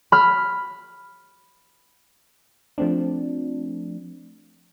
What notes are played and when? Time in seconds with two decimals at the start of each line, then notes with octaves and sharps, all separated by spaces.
0.12 B5 F6
2.78 F3 A3 C4 D4